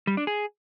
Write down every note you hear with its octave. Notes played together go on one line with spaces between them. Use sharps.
G3
D4
G#4